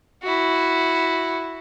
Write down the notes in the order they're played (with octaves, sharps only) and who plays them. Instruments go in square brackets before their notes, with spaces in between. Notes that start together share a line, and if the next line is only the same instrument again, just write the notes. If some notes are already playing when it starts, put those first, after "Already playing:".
[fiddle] E4 F#4